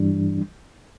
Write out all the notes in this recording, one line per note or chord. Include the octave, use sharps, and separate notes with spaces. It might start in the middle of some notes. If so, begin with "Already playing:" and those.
Already playing: G2 E3 G3 D4